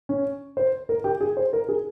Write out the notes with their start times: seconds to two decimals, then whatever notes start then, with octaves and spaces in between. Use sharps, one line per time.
0.09 C#4
0.57 C5
0.89 A#4
1.04 G4
1.21 G#4
1.37 C5
1.53 A#4
1.69 G#4